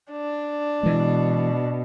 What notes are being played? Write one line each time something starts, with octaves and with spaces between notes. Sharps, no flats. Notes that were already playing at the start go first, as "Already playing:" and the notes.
D4
B2 E3 G#3